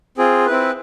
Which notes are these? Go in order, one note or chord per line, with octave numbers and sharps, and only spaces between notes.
C4 F4 G#4
C4 E4 B4